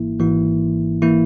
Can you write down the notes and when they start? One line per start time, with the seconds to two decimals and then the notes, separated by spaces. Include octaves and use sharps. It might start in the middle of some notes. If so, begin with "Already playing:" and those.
Already playing: G#1 G#2 E3 A#3 E4
0.19 G#1 G#2 E3 A#3 E4
1.02 E3 A#3 E4